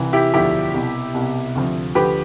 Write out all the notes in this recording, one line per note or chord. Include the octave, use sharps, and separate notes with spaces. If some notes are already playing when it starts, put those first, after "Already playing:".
Already playing: C2 C3 E3
E4 G4
E1 D2 D3 F3 E4 G4
C2 B2
C2 B2
D2 C3 F3
D2 D3 F3 G4 B4